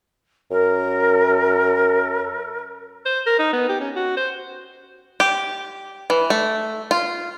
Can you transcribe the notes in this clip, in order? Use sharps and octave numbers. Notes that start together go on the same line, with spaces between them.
F#2 A#4
C5
A#4
D#4
B3
G4
C#4
F#4
C5
G4
E3
A3
F4